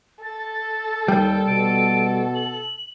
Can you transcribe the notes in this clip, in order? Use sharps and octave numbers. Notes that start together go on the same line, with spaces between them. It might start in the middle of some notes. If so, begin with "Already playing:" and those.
A4 A6
D#2 G3 G5
B2 D7
F#7